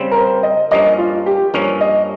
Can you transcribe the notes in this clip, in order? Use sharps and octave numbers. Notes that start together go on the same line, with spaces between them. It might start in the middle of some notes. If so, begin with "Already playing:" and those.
Already playing: C#3 G3 C4
A#4
C5
D#5
G2 F3 A#3 C#4 D#5
F4
G4
G2 F3 A#3 C#4 C#5
D#5